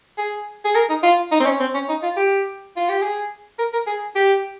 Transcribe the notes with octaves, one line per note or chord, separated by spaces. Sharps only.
G#4
G#4
A#4
D#4
F4
D#4
C4
C#4
C4
C#4
D#4
F4
G4
F4
G4
G#4
A#4
A#4
G#4
G4